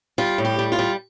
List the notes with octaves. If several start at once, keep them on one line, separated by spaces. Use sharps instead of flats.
G3 F4
A2
G4
G3
F4
G3